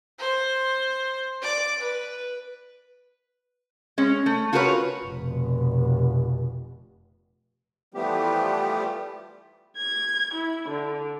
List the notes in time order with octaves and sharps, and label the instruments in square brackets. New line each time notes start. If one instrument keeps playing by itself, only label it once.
[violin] C5
D5 D6
B4
[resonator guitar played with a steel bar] G#3 C#4
A3
F4 F#4 G#4 A#4 B4 C#5
[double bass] F1 B2
[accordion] E3 F3 G3 A3 B3 G4
[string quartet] G#6
E4
D3